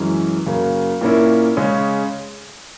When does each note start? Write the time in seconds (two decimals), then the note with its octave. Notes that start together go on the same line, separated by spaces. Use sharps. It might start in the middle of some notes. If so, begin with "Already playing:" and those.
Already playing: F#2 E3 G#3 C#4
0.46 F#2 C#3 F#3 A#3
1.01 A#2 A#3 C#4 E4
1.57 C#3 G#3 C#4